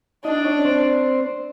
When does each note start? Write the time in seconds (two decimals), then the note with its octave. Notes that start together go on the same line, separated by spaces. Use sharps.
0.25 D4 D#4 D#5
0.45 C#4 C#5
0.65 C4 C5